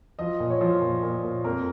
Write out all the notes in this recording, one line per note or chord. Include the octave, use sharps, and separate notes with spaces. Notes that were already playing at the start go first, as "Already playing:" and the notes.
F3 D#5
A#2
C#5
F3
A#2
A#2
A#2
F2 A#4